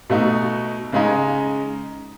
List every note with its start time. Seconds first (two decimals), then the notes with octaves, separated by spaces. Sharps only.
0.10 B2 A3 D#4
0.92 C#3 G#3 D#4